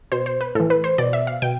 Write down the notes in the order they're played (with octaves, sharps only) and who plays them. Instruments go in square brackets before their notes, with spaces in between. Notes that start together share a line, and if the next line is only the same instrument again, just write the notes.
[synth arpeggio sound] B2 C5
C5
B4
A2 E3 A4
B4
C5
B2 D5
E5
F5
B2 G5